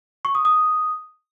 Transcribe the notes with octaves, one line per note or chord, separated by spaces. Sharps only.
C#6
D#6
D#6